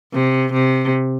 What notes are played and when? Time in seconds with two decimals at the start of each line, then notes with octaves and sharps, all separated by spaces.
0.13 C3
0.53 C3